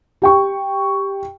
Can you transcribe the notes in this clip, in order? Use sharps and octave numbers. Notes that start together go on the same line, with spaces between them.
G4 G5 C#6